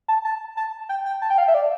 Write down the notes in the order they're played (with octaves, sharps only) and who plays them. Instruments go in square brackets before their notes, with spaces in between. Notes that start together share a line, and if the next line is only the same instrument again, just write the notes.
[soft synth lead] A5
A5
A5
G5
G5
A5
G5
F5
E5
D5